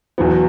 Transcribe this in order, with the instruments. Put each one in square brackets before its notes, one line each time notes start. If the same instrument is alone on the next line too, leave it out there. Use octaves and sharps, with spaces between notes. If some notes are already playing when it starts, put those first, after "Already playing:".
[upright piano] E2 B2 F#3 B3